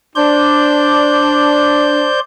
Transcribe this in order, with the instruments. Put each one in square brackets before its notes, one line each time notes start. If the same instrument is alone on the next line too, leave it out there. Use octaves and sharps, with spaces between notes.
[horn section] D4 [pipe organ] C5 D5 G6